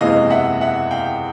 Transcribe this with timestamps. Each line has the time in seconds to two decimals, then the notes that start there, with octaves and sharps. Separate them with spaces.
0.01 F#1 E2 C3 E3 G#3 D#5 F5
0.30 E5 F#5
0.61 E5 F#5
0.91 F5 G5